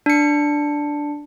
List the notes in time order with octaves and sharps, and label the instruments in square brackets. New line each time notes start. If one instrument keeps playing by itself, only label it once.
[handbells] D4 C#7